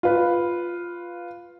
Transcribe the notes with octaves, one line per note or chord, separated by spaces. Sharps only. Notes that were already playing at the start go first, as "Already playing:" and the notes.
F4 B4